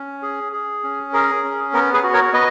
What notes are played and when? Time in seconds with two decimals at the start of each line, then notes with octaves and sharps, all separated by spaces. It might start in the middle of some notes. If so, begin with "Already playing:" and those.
Already playing: C#4
0.22 G#4
0.53 G#4
0.83 C#4
1.13 G#4 A#4
1.43 C#4
1.73 B3 A#4
1.94 G#4 B4
2.04 F#4
2.14 A#4 C#5
2.34 B3 B4 D#5